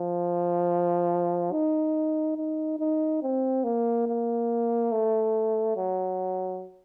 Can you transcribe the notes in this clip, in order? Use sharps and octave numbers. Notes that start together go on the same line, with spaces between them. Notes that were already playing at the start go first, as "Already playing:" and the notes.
Already playing: F3
D#4
D#4
D#4
C4
A#3
A#3
A3
F#3